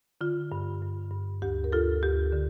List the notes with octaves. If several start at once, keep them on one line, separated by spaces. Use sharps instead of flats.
D3 F4
G2
G2
G2
D2 G4
A#4
D2 F4 A4
D2 G4
D3